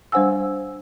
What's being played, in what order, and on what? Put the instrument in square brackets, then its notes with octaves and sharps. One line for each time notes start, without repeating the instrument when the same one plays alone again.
[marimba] G3 D4 C5 F#5 G#5 E6